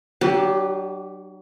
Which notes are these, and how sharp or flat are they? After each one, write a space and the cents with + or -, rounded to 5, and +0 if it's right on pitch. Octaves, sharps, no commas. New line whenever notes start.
F#3 +35 D4 +35 G4 +0